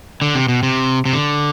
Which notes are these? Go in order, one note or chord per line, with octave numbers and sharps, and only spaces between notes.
D3
C3
B2
C3
C3
D3